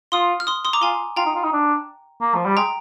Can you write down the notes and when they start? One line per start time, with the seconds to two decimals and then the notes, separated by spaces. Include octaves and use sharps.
0.12 F4 C6 D#6
0.40 F6
0.47 C6 D#6
0.65 C6 D#6
0.73 A#5 D6
0.82 F4 G#5 C6
1.16 F4 G5 A#5
1.26 D#4
1.35 F4
1.43 D#4
1.53 D4
2.21 A#3
2.35 F3
2.46 G3
2.57 G#3 G5 A#5